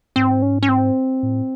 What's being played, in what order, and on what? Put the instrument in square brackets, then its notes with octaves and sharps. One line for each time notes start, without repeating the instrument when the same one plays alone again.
[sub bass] G#2 [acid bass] C4
[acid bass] C#4
C#4
C4
[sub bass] A2